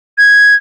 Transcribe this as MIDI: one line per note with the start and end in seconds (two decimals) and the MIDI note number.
0.18 0.55 92